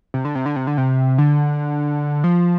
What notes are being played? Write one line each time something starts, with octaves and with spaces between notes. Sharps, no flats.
C3
D3
C3
D3
C3
D3
C3
D3
F3